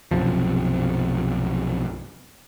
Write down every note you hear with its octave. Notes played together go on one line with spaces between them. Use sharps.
B1 F#2 C3 F3